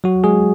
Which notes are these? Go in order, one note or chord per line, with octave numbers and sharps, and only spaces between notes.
F#3 F#4
G#3 G#4